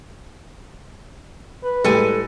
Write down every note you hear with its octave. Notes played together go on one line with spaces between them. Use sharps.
B4
A2 G3 G#3 A4 G#5